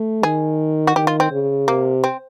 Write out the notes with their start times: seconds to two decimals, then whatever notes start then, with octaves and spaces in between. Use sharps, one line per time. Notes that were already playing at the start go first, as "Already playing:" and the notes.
Already playing: A3
0.23 D#3 G#4
0.87 F#4
0.95 D#3 G4
1.07 F4
1.20 C4
1.31 C#3
1.68 C3 A#3
2.04 C4